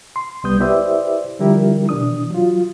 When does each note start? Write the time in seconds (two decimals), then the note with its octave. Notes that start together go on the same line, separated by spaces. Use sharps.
0.16 C6
0.44 C2 G3 B3 D#6 G6
0.60 E4 G4 B4 C5 D5 E5
1.39 D3 F3 G3 E4 G4 A#4
1.89 B2 E3 D4 D#6
2.31 F#3 F4